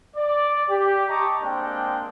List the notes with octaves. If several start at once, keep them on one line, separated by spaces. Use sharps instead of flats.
D5
G4
D#5 G5 A5 A#5 C#6 D6
G#3 A#3 C4 D4 G5